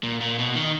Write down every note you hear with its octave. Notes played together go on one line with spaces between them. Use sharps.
A#2
A#2
B2
D#3